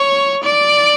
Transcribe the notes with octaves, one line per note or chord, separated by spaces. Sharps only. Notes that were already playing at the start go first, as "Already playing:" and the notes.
Already playing: C#5
D5